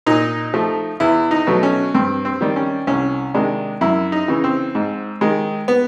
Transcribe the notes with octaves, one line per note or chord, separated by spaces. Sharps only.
A#2 D#4
F3 A3
E2 E4
D#4
B2 F#3 A3
C#4
G2 C4
C4
D#3 G3
C#4
C2 C#4
C3 D#3 G#3 D4
F#2 E4
D#4
C#3 E3
C4
G#2
D#3 G#3
B3